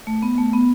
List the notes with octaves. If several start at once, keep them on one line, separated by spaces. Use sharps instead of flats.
A3
B3
A3
B3